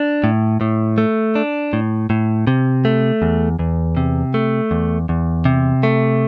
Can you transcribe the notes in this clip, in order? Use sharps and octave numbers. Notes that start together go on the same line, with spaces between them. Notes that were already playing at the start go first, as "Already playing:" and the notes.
Already playing: D4
A2
A2
A3
D4
A2
A2
C3
A3
E2
E2
C3
A3
E2
E2
C3
A3